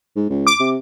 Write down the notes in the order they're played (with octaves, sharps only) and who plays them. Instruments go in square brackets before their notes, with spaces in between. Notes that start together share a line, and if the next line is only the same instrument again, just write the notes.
[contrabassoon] G#2
C#2
[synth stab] D6
[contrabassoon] C3